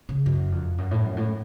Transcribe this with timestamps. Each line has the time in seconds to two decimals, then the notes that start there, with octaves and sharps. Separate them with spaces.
0.09 C#3
0.26 F#2
0.52 F2
0.78 F#2
0.91 A2
1.04 F#2
1.17 A2